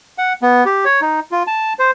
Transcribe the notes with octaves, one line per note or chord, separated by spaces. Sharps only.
F#5
B3
G4
C#5
D#4
F4
A5
C5